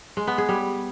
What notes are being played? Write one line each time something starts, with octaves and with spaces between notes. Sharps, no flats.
G#3
B3
G#4
G3